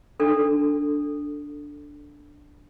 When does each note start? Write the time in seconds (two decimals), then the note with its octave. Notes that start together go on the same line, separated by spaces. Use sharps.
0.20 D4 A4